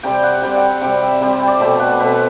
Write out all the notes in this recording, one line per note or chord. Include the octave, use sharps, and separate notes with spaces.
C3 G3 C4 G5
F#5
C3 G3 C4 G5
F#5
C3 G3 C4 G5
E5
C3 G3 C4
C5
D5
B2 A3 C4 E5
F#5
B2 A3 C4 B4